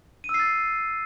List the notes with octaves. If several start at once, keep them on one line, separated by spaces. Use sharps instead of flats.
D#7
E6
C7
A6